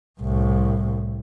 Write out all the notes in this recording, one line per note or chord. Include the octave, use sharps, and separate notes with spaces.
C2 A2